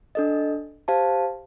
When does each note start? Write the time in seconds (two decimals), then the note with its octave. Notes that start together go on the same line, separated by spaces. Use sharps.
0.15 D4 A4 D#5
0.88 G4 C5 F5 A5